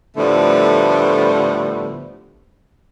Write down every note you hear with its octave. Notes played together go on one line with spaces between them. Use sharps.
A2 D3 F3 G3 A3 B3